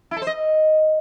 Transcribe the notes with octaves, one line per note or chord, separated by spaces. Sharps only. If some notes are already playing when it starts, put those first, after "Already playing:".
E4
A4
C5
D#5